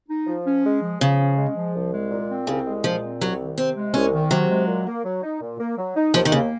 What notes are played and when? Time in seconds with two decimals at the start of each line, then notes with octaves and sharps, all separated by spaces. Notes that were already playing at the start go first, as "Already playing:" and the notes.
0.08 D#4
0.27 F3
0.46 C#4
0.65 G#3
0.82 F3
1.00 C#3 F3
1.19 C#4
1.37 G#3
1.56 F3
1.74 C2
1.92 G#3
2.11 A#2
2.29 C4
2.47 C2 C#3
2.66 G#3
2.84 A#2 F3
3.02 C4
3.21 C2 F#3
3.39 D#3
3.58 C3 C4
3.76 G#3
3.94 C2 C#4
4.13 D#3
4.31 C3 F#3
4.49 G#3
4.67 A#2
4.86 A#3
5.04 F#3
5.23 D#4
5.41 A#2
5.59 A#3
5.77 F#3
5.96 D#4
6.14 D#2 F3
6.25 D#3
6.32 C#3 A#3